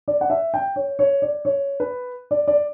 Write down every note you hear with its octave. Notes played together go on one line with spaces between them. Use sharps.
D5
F#5
E5
G5
C#5
C#5
D5
C#5
B4
D5
D5